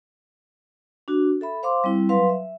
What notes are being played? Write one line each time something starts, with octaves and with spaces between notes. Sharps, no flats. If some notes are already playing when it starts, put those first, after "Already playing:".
D4 F#4
A4 E5 B5
C5 F5 C6 D6
G3 C4 E4
F#3 B4 F5 C6
E5